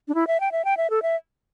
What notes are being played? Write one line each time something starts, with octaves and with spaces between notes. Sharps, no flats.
D4
E4
E5
G5
E5
G5
E5
A4
E5